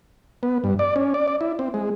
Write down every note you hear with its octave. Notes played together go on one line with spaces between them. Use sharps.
B3
G2
D5
C#4
D5
D5
E4
C4
G#3